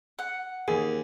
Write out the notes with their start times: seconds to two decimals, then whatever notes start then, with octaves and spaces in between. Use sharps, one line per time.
0.19 F#5
0.68 D#2 G#4